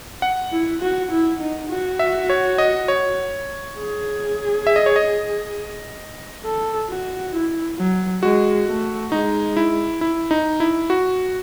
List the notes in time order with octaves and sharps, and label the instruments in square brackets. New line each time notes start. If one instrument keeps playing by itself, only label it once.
[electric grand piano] F#5
[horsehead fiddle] E4
F#4
E4
D#4
F#4
[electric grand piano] E5
C#5
D#5
C#5
[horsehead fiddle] G#4
[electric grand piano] E5
D#5
C#5
D#5
[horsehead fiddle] A4
F#4
E4
F#3
[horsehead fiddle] G#3 [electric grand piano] F#4
[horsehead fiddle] A3
[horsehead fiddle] G#3 [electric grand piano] D#4
[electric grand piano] E4
E4
D#4
E4
F#4